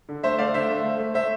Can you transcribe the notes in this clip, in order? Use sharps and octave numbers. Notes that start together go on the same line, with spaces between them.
D3
A3 C5 E5
A3 D5 F5
D3 C5 E5
A3
A3
A3
A3 C5 E5